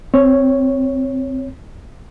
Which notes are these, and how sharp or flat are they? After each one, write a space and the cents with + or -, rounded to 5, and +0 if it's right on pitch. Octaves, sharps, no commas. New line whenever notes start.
C4 +0 C#5 +0